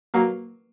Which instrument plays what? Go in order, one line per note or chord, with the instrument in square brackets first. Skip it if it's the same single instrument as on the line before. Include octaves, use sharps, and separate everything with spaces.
[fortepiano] F#3 A#3